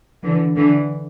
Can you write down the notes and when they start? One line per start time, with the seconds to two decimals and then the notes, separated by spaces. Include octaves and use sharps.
0.24 D3 E3
0.56 D3 E3